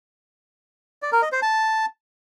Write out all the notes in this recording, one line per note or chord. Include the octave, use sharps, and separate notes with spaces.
D5
A#4
D#5
C5
A5